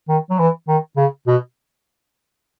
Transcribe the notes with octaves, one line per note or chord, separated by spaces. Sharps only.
D#3
F#3
E3
D#3
C#3
B2